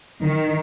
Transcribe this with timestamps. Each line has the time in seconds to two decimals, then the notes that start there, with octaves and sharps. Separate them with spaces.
0.22 D#3